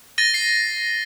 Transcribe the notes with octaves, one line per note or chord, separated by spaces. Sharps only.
A6 A#6 D#7 G7
C7